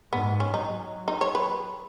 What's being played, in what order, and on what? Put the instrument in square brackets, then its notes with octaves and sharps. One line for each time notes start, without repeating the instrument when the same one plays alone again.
[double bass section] G#2 [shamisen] B3
[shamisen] C#4
[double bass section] F#3 [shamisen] D#4
[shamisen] D#4
C#5
B4